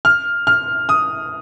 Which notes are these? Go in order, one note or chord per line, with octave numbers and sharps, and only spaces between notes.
F6
F6
D#6